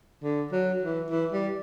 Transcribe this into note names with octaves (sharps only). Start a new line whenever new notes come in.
D3
F#3
E3
E3
G3